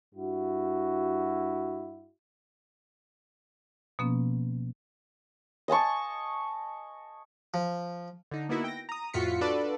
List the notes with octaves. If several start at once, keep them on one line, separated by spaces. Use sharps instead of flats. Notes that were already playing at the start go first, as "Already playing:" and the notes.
G2 E4 F#4
B2 F3 A#3 B3 C#4
D#5 G#5 A5 C#6
F3
D3 D#4
A#3 B3 D#4 E4 F#4
G5 A#6
A#5 D#6
F2 A2 F4 F#4 B6 C#7
D4 F4 F#4 A4 B4 D5